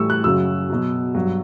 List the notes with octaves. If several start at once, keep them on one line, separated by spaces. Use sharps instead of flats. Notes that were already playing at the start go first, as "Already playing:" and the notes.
Already playing: A2 E3 G3 C#6 E6
F#6
F#2 C#3 F#3 E6
B2 F#3
G2 F#3